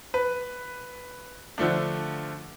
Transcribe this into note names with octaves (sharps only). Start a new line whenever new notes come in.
B4
D3 F3 A3 D4